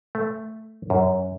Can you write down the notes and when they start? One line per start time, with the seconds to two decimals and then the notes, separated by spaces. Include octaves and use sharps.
0.15 A3
0.90 F#2